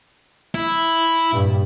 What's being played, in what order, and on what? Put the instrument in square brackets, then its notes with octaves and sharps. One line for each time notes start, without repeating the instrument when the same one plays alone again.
[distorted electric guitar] E4
[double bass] G2 A#2